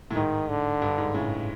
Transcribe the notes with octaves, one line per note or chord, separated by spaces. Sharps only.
A2
G#2 D#3
D3
G2
G#2
A2 C#3